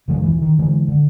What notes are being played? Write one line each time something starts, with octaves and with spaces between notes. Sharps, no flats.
F#2 C#3 F3 G#3
D#1 E3
D#3
D3 E3 G#3
D3